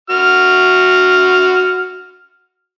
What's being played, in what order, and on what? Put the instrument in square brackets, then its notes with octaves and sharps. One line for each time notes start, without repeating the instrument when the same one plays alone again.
[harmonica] F#4 F6